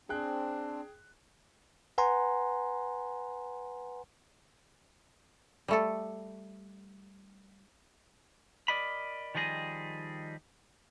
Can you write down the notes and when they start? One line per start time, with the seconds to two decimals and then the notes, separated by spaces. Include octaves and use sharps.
0.09 C4 D4 G#4 G5 F#6
1.98 B4 F#5 G#5 A#5 C6
5.68 G3 A3 A4
8.68 A#4 D5 D#5 B5
9.35 D#3 F3 G3 G#4 D#5